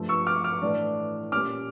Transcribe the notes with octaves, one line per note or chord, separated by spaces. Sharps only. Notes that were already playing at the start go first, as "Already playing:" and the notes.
Already playing: G2 F3 A3
C#6 E6
D6 F6
D6 F6
A2 E3 A3 D4
A#2 G3 C#4 D6 F6